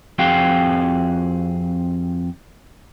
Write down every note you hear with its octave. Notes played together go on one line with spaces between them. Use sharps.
F2 C4 F#4 G#4 F5 G5